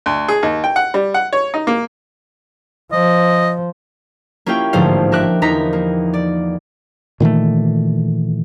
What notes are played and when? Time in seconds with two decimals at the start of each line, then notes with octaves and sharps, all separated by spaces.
0.06 D2
0.28 G#4
0.43 D#2
0.64 G5
0.76 F#5
0.94 G3
1.14 F#5
1.33 C#5
1.54 D#4
1.67 A#3
2.92 F3 D#5
4.46 A#3 C#4 E4 F4 G4 G5
4.73 A1 G#2 D3 F3 C5 F5
5.12 G4 A#4 E5 D6 F#6
5.42 E2 F3 D#4 A#4 A#5 B6
5.73 A#3
6.13 D5
7.20 A#2 D#3 E3 A3